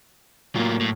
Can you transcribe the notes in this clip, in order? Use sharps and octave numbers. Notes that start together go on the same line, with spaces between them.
A2 F#3 A#3 F4
A2